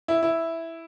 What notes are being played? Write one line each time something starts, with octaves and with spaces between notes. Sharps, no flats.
E4
E4